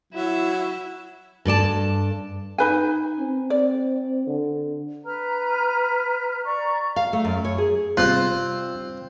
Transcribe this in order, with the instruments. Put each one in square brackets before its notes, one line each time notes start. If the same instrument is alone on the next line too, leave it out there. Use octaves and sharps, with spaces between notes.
[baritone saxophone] F#3 [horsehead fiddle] E4 E5
[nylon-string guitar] G2 A4 D5 A5
[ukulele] D#4 B4 G#5
[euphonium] C4
[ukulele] D5
[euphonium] D3
[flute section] B4 A#5 F6
D5 A#5 C#6
[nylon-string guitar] F5
A3
F#2
C#5
G#4
[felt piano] C3 G3 [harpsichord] C4 C5 [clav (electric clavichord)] F4 [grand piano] F#6